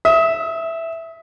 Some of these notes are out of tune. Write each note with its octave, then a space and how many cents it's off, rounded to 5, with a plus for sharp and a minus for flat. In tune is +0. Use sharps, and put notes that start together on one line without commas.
E5 +0 D#6 +35